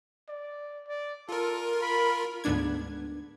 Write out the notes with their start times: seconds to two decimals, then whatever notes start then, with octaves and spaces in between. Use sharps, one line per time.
0.29 D5
0.88 D5
1.29 F4 A4 A#4
1.82 B5
2.44 D2 G#2 B3 D4 G#6